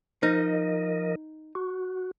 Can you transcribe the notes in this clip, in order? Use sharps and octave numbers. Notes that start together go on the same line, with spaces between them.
F3 D#4 A#4 D#5
F#4